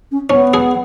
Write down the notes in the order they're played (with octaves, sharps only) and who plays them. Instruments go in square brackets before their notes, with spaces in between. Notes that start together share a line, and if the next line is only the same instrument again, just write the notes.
[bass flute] C#4
[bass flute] B3 [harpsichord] C#4
[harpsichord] G#4